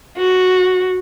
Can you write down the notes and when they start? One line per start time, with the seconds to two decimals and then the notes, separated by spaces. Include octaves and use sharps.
0.17 F#4